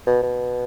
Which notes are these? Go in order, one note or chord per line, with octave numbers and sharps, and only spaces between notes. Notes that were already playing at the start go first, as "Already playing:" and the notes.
B2
B2